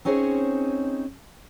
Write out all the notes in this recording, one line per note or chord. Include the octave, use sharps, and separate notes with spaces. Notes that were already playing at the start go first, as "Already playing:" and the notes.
C4 C#4 D#4 G#4 C5 C#5